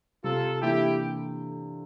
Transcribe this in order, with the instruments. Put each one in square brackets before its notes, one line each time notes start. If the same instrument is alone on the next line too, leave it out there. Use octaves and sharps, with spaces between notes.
[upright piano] C3 [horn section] F4 A4
[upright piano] E3 A#3 D4 A4 [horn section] E4 G4